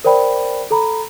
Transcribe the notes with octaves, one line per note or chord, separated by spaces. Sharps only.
A#4 C5 D5 G5 B5
A4 A#5 B5